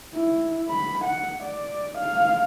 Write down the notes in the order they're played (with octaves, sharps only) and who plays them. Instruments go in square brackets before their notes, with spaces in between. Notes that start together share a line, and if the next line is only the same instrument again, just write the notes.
[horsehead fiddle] E4
B5
F#5
D5
F5